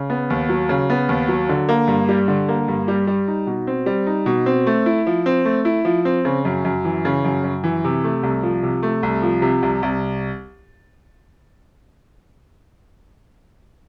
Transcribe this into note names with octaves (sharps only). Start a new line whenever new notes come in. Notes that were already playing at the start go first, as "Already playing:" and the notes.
Already playing: C#3
B3
D#2
F#3
C#3
B3
D#2
F#3
D3
A#3
G2
G3
D3
A#3
G2
G3
G3
D#4
B2
C4
G3
D#4
B2
C4
A3
E4
F3
C4
A3
E4
F3
C4
C#3
F#2
F#2
E3
C#3
F#2
F#2
E3
C3
A3
C2
F3
C3
A3
C2
F3
C3
C2
C2